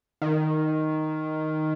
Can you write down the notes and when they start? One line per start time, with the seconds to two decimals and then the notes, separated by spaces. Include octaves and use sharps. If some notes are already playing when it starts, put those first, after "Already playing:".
0.22 D#3 D#4